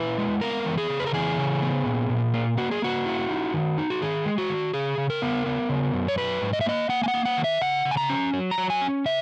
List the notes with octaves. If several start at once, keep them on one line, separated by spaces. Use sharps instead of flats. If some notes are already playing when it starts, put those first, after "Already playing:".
Already playing: A#2 E4 B4
G#3
B3 A#4
E3
G#4
C#3
B4
A#4
E3 G#4
C#3
B3
A#2
A#2
A#3
A#3 F#4
G#4
A#3 F#4
E4
D#4
D#3
D#4
F#4
D#3 G#4
G#3
F#4
D#3
C#3 G#4
C#3
A#4
B3
B3
C#3
F#2
C#5
F#3 B4
G#2
D#5
E5
A#3 D#5
A#3 F#5
G#5
F#5
A#3
F#5
D#3
E5
C#3 F#5
C#3
G#5
A#5
C#4
F#3
A#5
F#3
G#5
C#4
C#3 E5